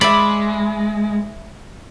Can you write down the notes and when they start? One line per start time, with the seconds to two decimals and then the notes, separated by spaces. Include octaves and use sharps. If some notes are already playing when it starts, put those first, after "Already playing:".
0.01 G#3 D5 E5 B5